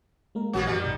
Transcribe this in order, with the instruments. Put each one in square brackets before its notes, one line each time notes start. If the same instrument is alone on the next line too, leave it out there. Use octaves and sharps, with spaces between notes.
[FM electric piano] G#3 A#3 A#4
[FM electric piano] A#1 E3 F#3 [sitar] A#3 B3 F#4
[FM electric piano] F#2 [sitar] D#3 G3
[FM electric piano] A1 B2